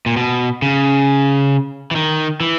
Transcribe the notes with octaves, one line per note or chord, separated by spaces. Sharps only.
A#2
B2
C#3
E3
D#3
E3